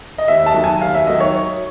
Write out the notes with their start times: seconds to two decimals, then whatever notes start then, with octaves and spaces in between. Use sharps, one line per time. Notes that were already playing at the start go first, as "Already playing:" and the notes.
0.18 D#5
0.28 D#2 E5
0.46 A5
0.54 D#3 F#3
0.64 G#5
0.81 D#2 F5
0.95 E5
1.07 D#3 F#3 D#5
1.20 C#5